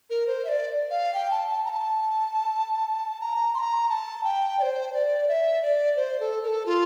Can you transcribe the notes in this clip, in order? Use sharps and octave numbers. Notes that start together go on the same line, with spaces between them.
A#4
C5
E5
D5
F5
G5
A5
A5
A#5
A5
A#5
C6
A#5
A5
G5
D5
C5
D5
E5
D5
C5
A4
A#4
A4
F4